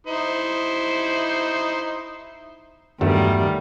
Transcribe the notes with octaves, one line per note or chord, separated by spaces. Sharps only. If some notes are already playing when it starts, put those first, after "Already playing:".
D#4 E4 C5
E2 G2 D#3 F#3 G3 A3